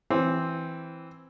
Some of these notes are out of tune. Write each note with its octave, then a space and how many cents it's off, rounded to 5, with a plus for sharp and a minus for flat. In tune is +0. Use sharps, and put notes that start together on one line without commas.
E3 +0 C4 +0